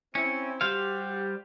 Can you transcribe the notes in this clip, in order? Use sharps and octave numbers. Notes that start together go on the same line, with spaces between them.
C4 C#4 E4
G3 F#4 G4 C5 F5